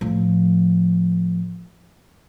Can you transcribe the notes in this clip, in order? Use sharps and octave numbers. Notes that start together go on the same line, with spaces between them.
A2 F3